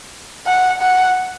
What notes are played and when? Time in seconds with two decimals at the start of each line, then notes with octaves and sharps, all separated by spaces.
0.47 F#5
0.81 F#5